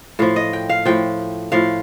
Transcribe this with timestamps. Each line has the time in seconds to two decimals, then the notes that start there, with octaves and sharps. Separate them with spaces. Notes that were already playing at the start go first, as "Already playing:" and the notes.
0.19 A2 F3 F5
0.36 D#5
0.53 G5
0.69 F5
0.85 A2 F3 G5
1.52 A2 F3 F5